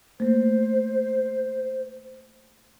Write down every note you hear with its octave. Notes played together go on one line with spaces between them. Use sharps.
A3 A#3 C5